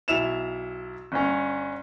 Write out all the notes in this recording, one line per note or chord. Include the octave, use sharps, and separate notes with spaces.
B1 E4 E7 F7
G1 C#4